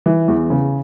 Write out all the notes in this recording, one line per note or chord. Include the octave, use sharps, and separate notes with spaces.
E3
E2
C#3